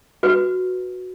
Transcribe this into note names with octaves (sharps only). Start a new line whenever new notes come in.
F#4 B4